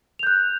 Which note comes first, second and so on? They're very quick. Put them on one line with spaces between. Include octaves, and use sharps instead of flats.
F7 G6 F#6